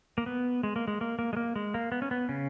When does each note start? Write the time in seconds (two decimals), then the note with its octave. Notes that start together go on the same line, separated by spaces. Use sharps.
0.18 A#3
0.26 B3
0.63 G#3
0.76 A#3
0.88 G#3
1.01 A#3
1.19 A#3
1.33 G#3
1.37 A#3
1.56 G#3
1.74 A#3
1.92 B3
2.02 C#4
2.11 B3
2.29 C#3 C#4